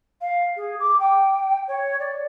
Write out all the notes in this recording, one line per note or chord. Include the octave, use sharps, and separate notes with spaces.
F5
G#4
D6
G5
C#5
D5